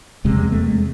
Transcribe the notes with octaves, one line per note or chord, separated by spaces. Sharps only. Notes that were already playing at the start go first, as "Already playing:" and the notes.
F1 E2 C3 G#3
G#3
A3
G#3